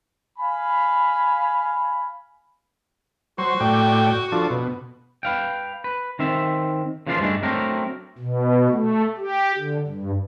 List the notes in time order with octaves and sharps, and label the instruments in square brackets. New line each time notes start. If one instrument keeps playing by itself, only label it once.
[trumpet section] F5 G#5 B5
[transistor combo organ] F#3 C5 [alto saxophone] F#4
[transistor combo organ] A2 D5 G5
F3 D4 A4
B2
[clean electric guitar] B4 F5 G5
B4
D#3 C4 E5
C#3 E3 F3 A#3 D4 F4
G2 G#3 A3 D4
F#3 A3 C4 D4 A#4
[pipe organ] B2
A3
G4
D3
G2